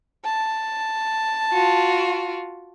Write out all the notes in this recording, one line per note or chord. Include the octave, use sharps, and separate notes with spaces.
A5
F4 F#4